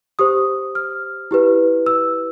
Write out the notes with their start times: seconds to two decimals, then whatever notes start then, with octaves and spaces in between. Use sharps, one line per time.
0.19 G4 C5 D#6
0.75 F6
1.31 E4 G4 B4
1.86 E6